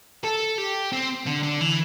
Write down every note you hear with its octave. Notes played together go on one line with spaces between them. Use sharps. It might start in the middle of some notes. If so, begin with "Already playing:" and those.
A4
G4
C4
D3
D3
E3